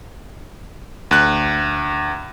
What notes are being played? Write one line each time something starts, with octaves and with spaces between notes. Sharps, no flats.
D2 F#6